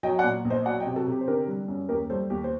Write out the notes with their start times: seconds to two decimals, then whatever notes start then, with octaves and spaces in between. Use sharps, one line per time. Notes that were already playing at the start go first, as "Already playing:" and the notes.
0.03 F#3 D#5 G5
0.19 D5 F#5
0.24 A#2
0.45 A#1
0.50 C5 D#5
0.65 F#3 D5 F#5
0.80 D#5 G5
0.86 C3
0.96 F#4 A4
1.07 C3 G4
1.21 C5
1.28 D3 G4 A#4
1.48 G3
1.68 F#2
1.89 D#2 G4 A#4
2.10 G3 A4 C5
2.30 D#2 G4
2.44 C5